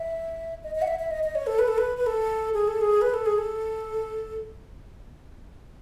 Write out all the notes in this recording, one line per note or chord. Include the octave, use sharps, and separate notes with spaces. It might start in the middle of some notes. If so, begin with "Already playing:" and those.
Already playing: E5
D#5
D#5
F#5
E5
E5
D#5
D#5
C#5
A4
B4
A4
B4
B4
A4
G#4
A4
G#4
B4
A4
G#4
A4